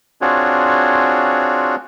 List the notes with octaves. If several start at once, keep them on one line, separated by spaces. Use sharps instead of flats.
C4 D4 F4 F#4 G#4 C#5